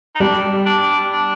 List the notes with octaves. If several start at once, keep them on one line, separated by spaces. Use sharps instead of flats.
D#4
G3 D4
D4
D4